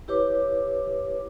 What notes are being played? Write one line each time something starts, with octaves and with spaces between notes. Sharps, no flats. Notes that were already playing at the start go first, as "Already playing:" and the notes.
E4 G4 B4 C#5 D6